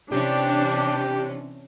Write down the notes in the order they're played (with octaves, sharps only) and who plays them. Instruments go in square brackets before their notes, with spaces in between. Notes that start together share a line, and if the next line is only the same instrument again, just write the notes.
[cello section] C3 E3 C#4 [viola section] D4 [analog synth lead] G4